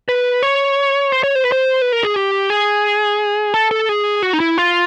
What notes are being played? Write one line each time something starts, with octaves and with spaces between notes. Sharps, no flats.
B4
C#5
C5
C#5
C5
B4
C5
B4
A#4
G#4
G4
G#4
A4
A4
G#4
F#4
D#4
E4
F4